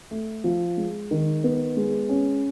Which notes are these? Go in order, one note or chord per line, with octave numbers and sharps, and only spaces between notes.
A3
F3
G#3
D#3
B3
G#3
C#4